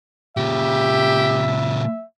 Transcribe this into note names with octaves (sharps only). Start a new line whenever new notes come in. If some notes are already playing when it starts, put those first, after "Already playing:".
A#2 C#3 G4 E5